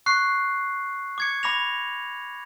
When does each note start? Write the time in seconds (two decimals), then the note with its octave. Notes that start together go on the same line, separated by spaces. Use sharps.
0.06 C#6 F#6 C7
1.18 D6 G#6 C#7
1.43 B5 D6 A#6 F7